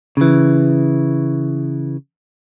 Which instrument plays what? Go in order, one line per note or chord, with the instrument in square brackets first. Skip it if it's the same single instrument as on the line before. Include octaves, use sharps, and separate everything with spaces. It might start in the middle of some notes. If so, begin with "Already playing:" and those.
[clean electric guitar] C#3 E3